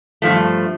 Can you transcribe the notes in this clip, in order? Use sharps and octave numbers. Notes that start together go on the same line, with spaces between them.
G2 F3 A3